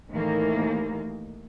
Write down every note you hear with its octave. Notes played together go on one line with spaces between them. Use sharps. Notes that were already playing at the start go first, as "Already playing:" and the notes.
D#2 A2 D#3 E3 A#3